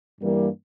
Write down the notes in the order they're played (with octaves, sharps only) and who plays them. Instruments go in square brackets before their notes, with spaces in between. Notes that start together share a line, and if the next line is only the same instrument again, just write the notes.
[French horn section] G2 E3 G3 A#3